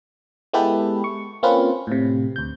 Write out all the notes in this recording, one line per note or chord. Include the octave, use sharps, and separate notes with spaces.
G#3 B3 E4 G4 A4 B4
C#6
A#3 C4 C#4 F4 B4
A2 C3
D2 G6